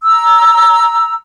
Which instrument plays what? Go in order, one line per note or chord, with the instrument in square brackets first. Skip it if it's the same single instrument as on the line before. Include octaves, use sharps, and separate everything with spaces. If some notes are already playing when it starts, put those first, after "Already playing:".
[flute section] A#5 E6